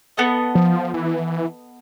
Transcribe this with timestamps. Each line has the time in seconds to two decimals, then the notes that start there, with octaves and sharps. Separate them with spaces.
0.17 B3 A4 D#5
0.55 F3
0.94 E3